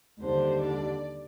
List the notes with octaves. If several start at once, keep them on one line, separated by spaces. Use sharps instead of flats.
D#2 D3 G3 D4 C5
D5